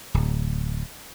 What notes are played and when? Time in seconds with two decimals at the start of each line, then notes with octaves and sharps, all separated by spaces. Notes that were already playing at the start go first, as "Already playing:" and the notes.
0.14 D1